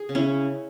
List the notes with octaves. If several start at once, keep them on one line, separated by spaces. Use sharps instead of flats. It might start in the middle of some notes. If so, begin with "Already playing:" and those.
Already playing: G#4
C#3
C#4 E4